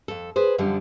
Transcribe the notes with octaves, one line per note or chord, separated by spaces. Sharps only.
F2 A4
G#4 B4 C5
F#2 D3 F3 G3